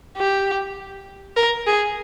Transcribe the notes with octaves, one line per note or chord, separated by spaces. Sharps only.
G4
A#4
G#4